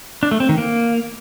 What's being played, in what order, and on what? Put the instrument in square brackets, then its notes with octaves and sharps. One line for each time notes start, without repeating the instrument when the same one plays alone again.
[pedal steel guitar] D4
A3
C4
D#3
A#3